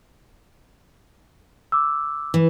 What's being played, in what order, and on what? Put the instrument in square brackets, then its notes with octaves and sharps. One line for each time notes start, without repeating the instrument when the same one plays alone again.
[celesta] D6 E6
[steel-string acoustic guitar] E3